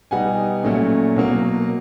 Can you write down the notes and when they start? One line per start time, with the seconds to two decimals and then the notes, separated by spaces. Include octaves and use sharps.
0.11 B2 G3 B3 D#4 F#5 G#5
0.63 A#2 F#3 A3 C#4
1.16 B2 F#3 A#3